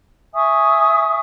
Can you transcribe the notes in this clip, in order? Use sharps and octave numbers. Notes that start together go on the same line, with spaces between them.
E5 G#5 C#6 D#6